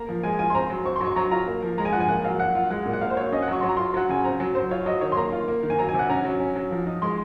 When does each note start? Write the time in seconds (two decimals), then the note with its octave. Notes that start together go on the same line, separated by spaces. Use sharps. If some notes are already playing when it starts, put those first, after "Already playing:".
Already playing: A#3 A#5
0.09 F3
0.23 G#3 G#5
0.39 F4 G#5
0.50 C6
0.55 C4 A#5
0.70 F#3
0.85 C4 C#6
0.96 C6
1.01 F#3
1.06 C#6
1.16 F#3 A#5
1.31 F4 A#5
1.47 A#3
1.63 F3
1.78 G#3 A#5
1.85 G#5
1.93 F3 F#5
2.00 G#5
2.08 A#3 F#5
2.24 F#3 F5
2.40 F#3 F#5
2.55 F4
2.70 G#3 F#5
2.85 A#2
2.93 F#5
3.01 A#3 F5
3.10 C5
3.16 F#3 C#5
3.32 C#4 D#5
3.42 F#5
3.48 F#3
3.53 C#6
3.61 F#3 C6
3.69 A#5
3.77 F4 C6
3.94 F#3 F#5
4.09 C#3 G#5
4.24 C4 A#5
4.40 F#3
4.55 F#3 C5
4.71 F4 C#5
4.86 F#3 D#5
5.01 D#3 C#5
5.12 C6
5.17 A#3 A#5
5.32 F4
5.48 A#3
5.63 D#3
5.70 G#5
5.78 F#3 A#5
5.89 G#5
5.94 C3
5.99 F#5
6.09 C#4 A#5
6.25 F#3
6.40 C#4
6.56 F#3
6.71 F3
6.86 D#4
7.02 G#3 C6